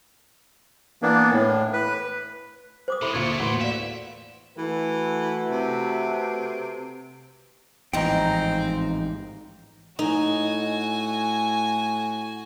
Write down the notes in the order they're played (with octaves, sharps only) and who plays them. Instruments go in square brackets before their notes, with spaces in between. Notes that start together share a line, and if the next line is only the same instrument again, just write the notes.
[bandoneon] E3 A#3 B3 D4
A2
B4
[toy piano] C5 D6 D#6
[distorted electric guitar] C3 D#3 [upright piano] E4 B5 [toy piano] A4
[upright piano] D2 A#2 [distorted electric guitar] A3 G4 [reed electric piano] F4 C#6 G#6
[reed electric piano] E2 A2 A#3 [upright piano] F#4 B4 C6
[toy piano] D5 F5 [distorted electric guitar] E5
[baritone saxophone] E3 [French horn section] A3 F#4 B4
[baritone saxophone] C3
[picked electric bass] A1 G#2 E3 [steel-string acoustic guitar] F2 D#4 [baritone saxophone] C4 [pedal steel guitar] G5 A#5
[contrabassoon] A2 [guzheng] D#4 [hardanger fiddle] F#4 G#5